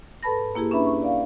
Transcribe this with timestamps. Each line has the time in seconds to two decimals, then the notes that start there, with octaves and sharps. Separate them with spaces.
0.23 G#2 A4 B4 A5 B5 A#6
0.55 A#3 E4 G4 G#4
0.71 C#4 D4 B4 E5 B5
0.86 C#6
1.02 D5 F5